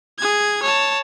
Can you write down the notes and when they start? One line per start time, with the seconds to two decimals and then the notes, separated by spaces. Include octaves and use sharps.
0.18 G#4 G#6
0.62 C#5 A5